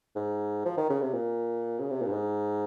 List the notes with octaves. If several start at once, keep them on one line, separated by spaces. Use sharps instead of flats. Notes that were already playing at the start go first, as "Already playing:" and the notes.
G#2
F3
D#3
C#3
C3
A#2
C#3
C3
A#2
G2
G#2